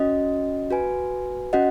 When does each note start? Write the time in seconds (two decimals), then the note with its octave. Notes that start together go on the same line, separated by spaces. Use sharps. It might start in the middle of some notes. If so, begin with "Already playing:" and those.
Already playing: C#4 F#4 D#5
0.71 F#4 B4 G#5
1.53 C#4 F#4 D#5 F#5